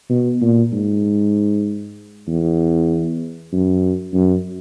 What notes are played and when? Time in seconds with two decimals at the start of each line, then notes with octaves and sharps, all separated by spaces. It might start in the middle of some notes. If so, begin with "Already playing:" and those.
0.10 B2
0.42 A#2
0.72 G#2
2.27 E2
3.52 F#2
4.14 F#2